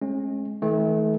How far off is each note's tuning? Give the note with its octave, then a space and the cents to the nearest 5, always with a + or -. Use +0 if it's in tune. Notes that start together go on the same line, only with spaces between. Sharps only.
G#3 +25 C#4 -35
D#3 +45 A3 -30